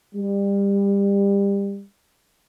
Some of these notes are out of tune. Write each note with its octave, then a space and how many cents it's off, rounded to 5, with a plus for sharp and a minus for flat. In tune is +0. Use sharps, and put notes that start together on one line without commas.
G3 +25